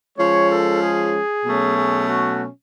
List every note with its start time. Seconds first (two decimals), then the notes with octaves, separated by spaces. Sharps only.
0.19 F3 G#3 C#4 C#5
0.51 A4
0.82 G#4
1.45 B2 F#3 A3 C#4
1.77 G#4
2.08 F#4